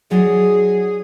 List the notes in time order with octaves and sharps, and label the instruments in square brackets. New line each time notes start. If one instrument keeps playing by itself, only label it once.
[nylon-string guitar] F#3 D#4 D5 [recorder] G#4